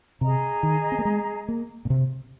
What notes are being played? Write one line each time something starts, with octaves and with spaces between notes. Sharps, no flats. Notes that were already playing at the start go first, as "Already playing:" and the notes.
C3 G#4 D#5 A#5
D#3
C4
A#3
G#3
A#3
A#2
C3